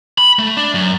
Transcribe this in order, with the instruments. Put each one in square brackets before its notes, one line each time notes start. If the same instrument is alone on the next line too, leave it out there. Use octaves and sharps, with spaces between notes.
[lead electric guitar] B5
A3
D4
F#2